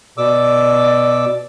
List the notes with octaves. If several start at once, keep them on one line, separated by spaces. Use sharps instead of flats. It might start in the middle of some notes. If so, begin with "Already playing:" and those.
B2 D5 D6 E6